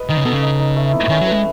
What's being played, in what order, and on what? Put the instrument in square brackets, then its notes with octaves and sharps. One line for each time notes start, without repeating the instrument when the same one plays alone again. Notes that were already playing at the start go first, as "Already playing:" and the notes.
Already playing: [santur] B4 D#5
[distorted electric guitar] D#3 [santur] D#4
[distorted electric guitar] C#3
[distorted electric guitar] B2 [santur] A4
[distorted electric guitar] C#3
[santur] D#4
D#4
A3
E4
[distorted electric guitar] D#3 [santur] C#4
[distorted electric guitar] F#3
[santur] B4
[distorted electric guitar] G#3